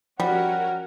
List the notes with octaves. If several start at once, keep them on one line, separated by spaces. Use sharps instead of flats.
F3 G3 C#4 F#4 A#4 F#5